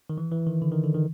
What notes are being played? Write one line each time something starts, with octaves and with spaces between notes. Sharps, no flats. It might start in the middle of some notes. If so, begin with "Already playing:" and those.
D#3
E3
E3
D#3
D3
D#3
D3
D#3